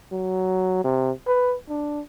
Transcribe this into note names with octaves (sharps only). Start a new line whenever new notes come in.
F#3
C3
B4
D4